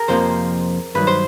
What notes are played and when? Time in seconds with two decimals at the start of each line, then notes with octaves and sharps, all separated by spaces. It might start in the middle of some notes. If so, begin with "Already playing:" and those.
Already playing: G#4 A#4
0.08 F2 C3 F3 A#3 C5
0.95 G2 D#3 F#3 B4
1.07 C5